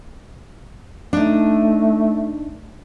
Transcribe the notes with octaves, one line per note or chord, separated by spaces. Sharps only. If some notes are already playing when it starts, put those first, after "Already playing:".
A3 D4 D#4